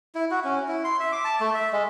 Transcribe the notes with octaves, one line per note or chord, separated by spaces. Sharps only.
E4
F#4
C#4
E4
C6
E5
D6
A5
A3
E5
G#3